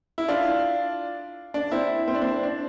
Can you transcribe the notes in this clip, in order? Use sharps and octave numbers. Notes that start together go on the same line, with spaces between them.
E4
D4 F4
D4
C4 E4
C4
D4
C4
D4